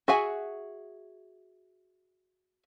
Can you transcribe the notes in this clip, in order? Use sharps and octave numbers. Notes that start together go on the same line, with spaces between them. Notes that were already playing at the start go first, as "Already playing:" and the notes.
F#4 G#4 E5 F#5 G#5